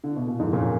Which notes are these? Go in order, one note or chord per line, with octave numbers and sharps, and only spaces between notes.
D3
B2
A#2
F2 G#2
F#2 A#2